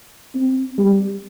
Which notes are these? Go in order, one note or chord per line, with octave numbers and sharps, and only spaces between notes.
C4
G3